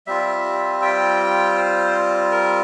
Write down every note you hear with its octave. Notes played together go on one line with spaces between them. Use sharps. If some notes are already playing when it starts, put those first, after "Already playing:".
G3 C4 F4 E5
G5
C5
A#4